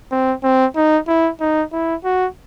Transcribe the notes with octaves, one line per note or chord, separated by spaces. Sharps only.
C4
C4
D#4
E4
D#4
E4
F#4